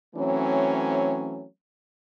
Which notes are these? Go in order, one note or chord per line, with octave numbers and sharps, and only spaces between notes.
E3 F#3 A3 C4 C#4